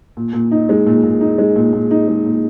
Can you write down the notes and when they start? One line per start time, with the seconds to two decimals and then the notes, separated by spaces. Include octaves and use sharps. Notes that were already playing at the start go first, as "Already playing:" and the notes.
0.17 A#2
0.33 A#2
0.51 D#4
0.69 G#3
0.87 A#2
1.03 A#2
1.21 D#4
1.38 G#3
1.56 A#2
1.73 A#2
1.91 D#4
2.08 G#3
2.25 A#2